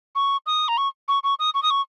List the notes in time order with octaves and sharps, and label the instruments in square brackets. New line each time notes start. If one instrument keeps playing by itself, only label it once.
[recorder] C#6
D#6
A#5
C#6
C#6
C#6
D#6
C#6
D#6
C#6